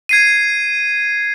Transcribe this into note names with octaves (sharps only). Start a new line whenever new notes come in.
G#6 C7 D#7